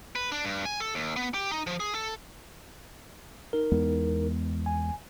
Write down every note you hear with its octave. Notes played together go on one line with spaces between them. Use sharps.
B4
D4
G2
G#5
A4
D#2
B3
G4
D#4
F3
G#4
A4
D#4 A#4
E2 G#3 B3
G#5